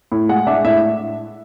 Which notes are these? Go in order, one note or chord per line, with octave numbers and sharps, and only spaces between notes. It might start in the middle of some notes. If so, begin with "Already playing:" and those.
A2
G#3 F#5
D4 E5
A2 E5